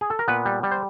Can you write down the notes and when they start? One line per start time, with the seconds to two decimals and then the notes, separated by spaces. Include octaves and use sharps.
0.01 G#4
0.10 A4
0.19 A#4
0.28 A#2 B3 B4
0.46 G3
0.63 G3
0.71 C5